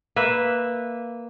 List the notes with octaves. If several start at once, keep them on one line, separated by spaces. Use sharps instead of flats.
A#3 B4 E5